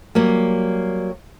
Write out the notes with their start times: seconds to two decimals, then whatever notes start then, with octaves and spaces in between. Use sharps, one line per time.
0.15 F#3 G3 A#3